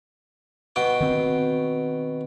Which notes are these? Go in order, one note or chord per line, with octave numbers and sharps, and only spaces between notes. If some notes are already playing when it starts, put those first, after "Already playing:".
B2 F#4 G5
D#3 C4